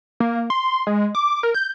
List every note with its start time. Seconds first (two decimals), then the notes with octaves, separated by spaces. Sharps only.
0.20 A#3
0.50 C6
0.87 G#3
1.15 D6
1.43 A#4
1.54 G6